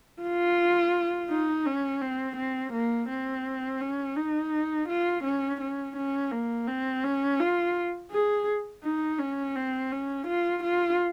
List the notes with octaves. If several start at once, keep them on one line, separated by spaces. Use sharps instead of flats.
F4
D#4
C#4
C4
C4
A#3
C4
C#4
D#4
F4
C#4
C#4
C#4
A#3
C4
C#4
F4
G#4
D#4
C#4
C4
C#4
F4
F4